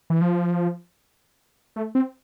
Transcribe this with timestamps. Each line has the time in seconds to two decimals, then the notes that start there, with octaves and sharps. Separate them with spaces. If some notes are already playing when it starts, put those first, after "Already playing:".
0.10 E3
0.21 F3
1.76 A3
1.95 C4